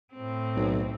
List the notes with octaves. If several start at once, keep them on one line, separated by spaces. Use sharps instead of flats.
A2 C4
B1